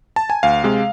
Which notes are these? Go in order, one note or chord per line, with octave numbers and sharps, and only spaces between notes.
A5
G#5
D2 F5
C3 G#3